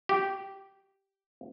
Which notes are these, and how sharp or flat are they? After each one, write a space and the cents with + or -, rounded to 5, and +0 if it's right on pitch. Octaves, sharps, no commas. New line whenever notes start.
G4 -10